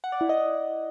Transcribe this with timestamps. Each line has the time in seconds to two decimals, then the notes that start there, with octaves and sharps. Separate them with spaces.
0.04 F#5
0.12 D5
0.21 E4
0.29 D#5